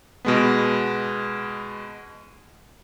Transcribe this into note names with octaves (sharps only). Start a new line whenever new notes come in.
B2 G#3 B3